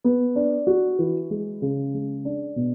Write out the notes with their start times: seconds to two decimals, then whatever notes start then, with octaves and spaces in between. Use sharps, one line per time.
0.04 B3
0.36 D4
0.67 F#4
0.99 E3
1.31 G#3
1.62 C#3
1.94 G#3
2.25 D4
2.56 B2